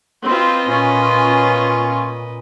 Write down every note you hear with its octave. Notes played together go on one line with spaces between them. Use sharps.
C4 F4 B4 D#5
A#2 C#4 F4